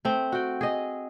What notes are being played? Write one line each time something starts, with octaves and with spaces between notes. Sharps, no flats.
A3 C4
F#4 G5
G#4 D#5